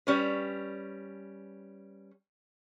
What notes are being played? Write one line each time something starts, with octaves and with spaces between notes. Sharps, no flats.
G3 C#4 B4